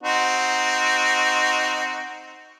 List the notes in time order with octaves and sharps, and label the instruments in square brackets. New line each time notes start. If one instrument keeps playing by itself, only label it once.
[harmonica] C4 D#4 F#4